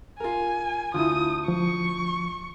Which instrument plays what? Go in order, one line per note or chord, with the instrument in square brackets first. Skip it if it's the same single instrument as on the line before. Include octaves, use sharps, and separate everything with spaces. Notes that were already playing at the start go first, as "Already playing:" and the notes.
[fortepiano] F4 A#4 [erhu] G#5
[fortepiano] D2 [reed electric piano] E4 F4 [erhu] D#6
[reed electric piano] F3 [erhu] C#6